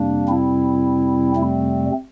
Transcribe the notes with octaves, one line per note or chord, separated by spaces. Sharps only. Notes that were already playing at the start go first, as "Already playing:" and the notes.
Already playing: F2 C3 G3 A#3 D4
C4 E4
A3 C4